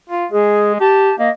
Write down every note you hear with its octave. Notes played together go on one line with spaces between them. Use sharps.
F4
G#3 G#4
G4 A5
A#3 D#5